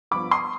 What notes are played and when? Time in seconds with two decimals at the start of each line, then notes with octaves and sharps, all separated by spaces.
0.11 G2 F3 B3 B5 D6
0.31 C6 D#6